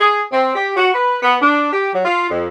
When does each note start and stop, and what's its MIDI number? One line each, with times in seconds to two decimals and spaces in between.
0.01 0.23 68
0.32 0.52 60
0.55 0.71 67
0.77 0.92 66
0.94 1.16 71
1.23 1.36 59
1.42 1.68 62
1.73 1.91 67
1.93 2.02 54
2.05 2.27 65
2.30 2.48 41